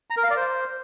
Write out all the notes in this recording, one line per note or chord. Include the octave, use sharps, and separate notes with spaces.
A#5
A#4
F5
D5
C5